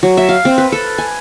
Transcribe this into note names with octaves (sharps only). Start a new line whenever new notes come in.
F#3
E5
F5
C4
B4
A4
G#5